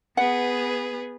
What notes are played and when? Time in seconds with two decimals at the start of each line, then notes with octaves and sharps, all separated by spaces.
0.17 B3 G#4 B4 F#5